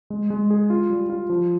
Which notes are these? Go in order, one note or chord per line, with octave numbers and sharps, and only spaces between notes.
G#3
G#3
G#4
F4
G3
F4
F3